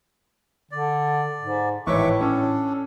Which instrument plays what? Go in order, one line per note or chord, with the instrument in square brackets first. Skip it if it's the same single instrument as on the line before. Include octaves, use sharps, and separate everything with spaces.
[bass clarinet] D3 [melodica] D5
[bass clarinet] G#2
[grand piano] G#1 E3 C#5 [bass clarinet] A2 [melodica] E5 C#6 D6
[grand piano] C#4 [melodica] D4 A4